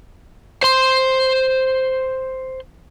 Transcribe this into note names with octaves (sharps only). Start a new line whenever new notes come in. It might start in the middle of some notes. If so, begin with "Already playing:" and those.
C5 C6